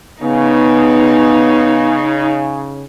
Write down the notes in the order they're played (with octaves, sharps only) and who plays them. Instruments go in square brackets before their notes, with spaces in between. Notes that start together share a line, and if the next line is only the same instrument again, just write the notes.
[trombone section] C#3 [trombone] B3 [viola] D#4